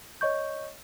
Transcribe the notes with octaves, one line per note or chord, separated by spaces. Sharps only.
C#5 D#5 C#6 G6